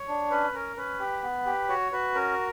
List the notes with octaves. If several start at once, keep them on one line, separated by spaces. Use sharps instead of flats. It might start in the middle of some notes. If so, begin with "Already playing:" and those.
Already playing: C#5
D4
C#4 B4
C#4 A#4
C#4 B4
G4
B3
G4
F#4 C#5
F#4 B4
C#4 A#4